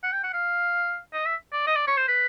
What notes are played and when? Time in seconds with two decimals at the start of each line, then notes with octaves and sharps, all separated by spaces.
0.03 F#5
0.13 G5
0.23 F#5
0.33 F5
1.14 D#5
1.25 E5
1.53 D5
1.67 D#5
1.76 D5
1.87 C#5
1.97 C5
2.08 B4